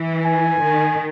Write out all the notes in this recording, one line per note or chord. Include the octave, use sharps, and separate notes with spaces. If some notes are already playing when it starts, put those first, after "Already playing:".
Already playing: E3
G#5
D#3